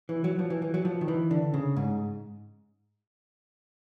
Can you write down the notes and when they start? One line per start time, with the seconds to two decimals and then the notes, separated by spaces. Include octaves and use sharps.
0.09 E3
0.24 F#3
0.39 F3
0.50 E3
0.62 E3
0.74 F#3
0.85 F3
1.01 D#3
1.08 E3
1.31 D3
1.54 C#3
1.76 G#2